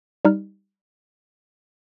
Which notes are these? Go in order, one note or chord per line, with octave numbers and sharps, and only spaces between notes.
G3 D#4 F6